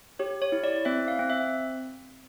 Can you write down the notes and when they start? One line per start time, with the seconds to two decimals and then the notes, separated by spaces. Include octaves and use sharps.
0.19 G4 C#5
0.42 C#5
0.52 E4
0.64 D5
0.85 C4 E5
1.08 F5
1.19 C4
1.30 E5